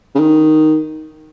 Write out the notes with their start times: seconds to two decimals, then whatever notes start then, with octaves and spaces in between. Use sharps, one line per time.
0.15 C#3
0.19 D#3